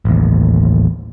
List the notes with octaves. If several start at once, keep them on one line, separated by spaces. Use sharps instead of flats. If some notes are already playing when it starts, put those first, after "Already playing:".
A1 D#2